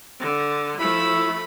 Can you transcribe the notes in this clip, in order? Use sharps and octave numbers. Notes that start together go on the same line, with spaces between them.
D3
F3 A3 E4 B5